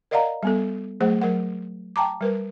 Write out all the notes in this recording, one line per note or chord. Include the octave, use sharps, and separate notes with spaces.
A#4 D5 D#5 F5 F#5 A#5
G3 B3 A4
F#3 A3 G#4 C5 F#5
F#3 A#4 F#5
G5 A5 A#5 D6
G3 A#4 B4